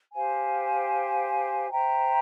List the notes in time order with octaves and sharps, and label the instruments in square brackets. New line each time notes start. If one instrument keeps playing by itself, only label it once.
[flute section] G4 C5 F5 G#5
C5 E5 G5 A#5